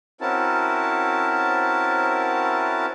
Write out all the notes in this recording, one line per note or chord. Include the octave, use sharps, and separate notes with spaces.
C4 C#4 E4 F#4 A#4 A5